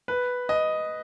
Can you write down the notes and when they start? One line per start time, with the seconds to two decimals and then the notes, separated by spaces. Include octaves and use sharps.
0.08 B4
0.49 D#5